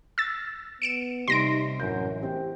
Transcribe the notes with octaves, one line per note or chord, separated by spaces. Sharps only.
E6 A6
B3 C#7 D7 E7
C3 G3 D#4 C6 A#6 D7
A1 F#2 G6
C4 G4